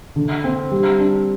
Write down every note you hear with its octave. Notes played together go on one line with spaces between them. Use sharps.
D3
C4
G3
D4